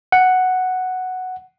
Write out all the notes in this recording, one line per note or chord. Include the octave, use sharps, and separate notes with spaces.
F#5